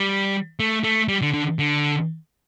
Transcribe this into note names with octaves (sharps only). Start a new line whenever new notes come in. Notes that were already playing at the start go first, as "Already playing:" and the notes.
Already playing: G3
A3
A3
G3
D3
D3
D3